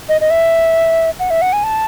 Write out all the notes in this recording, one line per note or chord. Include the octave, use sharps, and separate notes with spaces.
D#5
D#5
E5
F#5
E5
F#5
G#5
A5